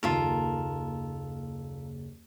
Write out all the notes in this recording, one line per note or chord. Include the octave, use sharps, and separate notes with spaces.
F#1 D#2 D#4 F4 A4 A#4